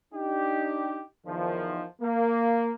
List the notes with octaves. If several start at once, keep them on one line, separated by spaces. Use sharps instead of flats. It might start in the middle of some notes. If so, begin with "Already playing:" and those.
D4 D#4 G4
E2 D#3 F3
A#3